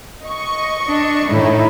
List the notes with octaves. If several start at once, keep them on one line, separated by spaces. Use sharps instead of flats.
D#5 C#6
D4
A2 D#3 D#4 E4